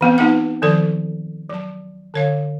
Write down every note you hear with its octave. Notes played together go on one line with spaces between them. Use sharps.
E3 B3 C4
B3 D#4 F4 G4 B4 F#5
D#3 F3 A4 D5
F#3 A5
D3 C#5 F5